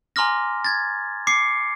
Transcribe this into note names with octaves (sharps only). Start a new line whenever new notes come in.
G#5 A#5 C6 D6 F6 A#6
G#6 A6
D6 C7 C#7